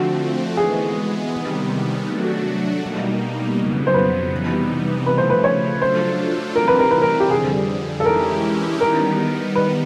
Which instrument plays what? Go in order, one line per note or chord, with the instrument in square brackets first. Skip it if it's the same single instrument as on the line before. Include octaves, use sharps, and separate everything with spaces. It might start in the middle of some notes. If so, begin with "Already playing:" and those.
Already playing: [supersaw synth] D3 F3 A3 C4 [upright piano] F#4
[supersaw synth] E3 G#3 B3 [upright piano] G#4
[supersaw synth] C3 D#3 G3 B3
F#3 A3 D4 F#4
B2 G3 A#3 D#4
F2 C#3 F#3 B3
[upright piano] C5
B4
[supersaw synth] C3 E3 G3 B3 D#4
[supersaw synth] C#3 F3 A3 [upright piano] B4
[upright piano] C5
B4
C#5
[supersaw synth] F#3 A3 D4 F4 A4 [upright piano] C5
[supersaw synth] C3 E3 G3 C4 [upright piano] A#4
[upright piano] B4
A#4
B4
A#4
G4
[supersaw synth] F2 D3 G3 [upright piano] G#4
[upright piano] A4
[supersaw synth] E3 G#3 C#4 E4 G4 [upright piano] A#4
[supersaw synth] D#3 G3 B3 D#4 [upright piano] A#4
[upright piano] B4